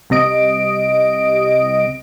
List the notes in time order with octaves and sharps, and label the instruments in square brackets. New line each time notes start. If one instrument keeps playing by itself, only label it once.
[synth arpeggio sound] C2 C3 D#5 D7